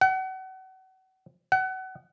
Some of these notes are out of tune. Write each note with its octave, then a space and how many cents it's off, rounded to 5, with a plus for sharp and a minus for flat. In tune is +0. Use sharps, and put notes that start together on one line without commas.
F#5 +35
F#5 +30